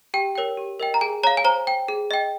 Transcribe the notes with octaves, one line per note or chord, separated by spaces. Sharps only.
G4 G5
A#4 C#5 G5
G4
A#4 D#5 G5
A#5
G#4 G#5
C#5 F5 A#5
G#5
C5 A#5
G5
G#4
D#5 G5